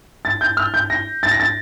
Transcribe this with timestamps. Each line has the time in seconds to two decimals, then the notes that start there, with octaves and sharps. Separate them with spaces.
0.25 A6
0.41 G6
0.57 F6
0.74 G6
0.90 A#6
1.23 A6
1.31 A#6
1.40 A6